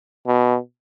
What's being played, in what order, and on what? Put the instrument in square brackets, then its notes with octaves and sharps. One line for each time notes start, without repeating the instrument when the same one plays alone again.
[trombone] B2